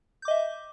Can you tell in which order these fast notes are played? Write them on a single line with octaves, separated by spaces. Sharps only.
G6 D6 D#5 E5